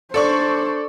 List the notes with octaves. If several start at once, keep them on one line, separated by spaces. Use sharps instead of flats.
D4 A4 C5 D5 C#6